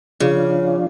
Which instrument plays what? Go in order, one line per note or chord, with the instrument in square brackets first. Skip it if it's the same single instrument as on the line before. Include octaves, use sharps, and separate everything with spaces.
[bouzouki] C#3 [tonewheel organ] F3 D4 F4